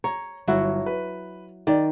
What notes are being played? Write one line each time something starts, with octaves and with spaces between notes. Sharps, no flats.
C#5 A#5
G1 F#3 E4 F#4
B4
D#3 D5